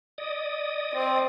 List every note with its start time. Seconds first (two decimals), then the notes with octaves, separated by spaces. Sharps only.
0.18 D5 D#5 D#6
0.94 C4